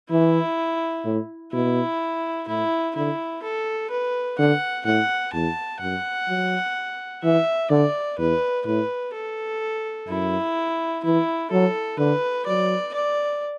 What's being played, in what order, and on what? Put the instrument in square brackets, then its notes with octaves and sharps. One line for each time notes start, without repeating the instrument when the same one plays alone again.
[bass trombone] E3 [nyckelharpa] E4
[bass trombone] A2
[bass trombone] B2 [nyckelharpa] E4
[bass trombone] A2 [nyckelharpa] E4
[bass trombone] D3 [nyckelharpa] E4
[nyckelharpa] A4
B4
[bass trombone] D3 [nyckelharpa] F#5
[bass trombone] A2 [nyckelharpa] F#5
[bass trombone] E2 [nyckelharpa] A5
[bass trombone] F#2 [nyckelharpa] F#5
[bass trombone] F#3
[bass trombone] E3 [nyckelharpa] E5
[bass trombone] D3 [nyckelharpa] D5
[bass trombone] E2 [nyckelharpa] B4
[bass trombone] A2 [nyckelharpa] B4
[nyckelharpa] A4
[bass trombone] F#2 [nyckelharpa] E4
[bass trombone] E3 [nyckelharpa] E4
[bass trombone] F#3 [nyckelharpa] A4
[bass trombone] D3 [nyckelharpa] B4
[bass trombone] F#3 [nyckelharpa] D5
[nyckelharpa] D5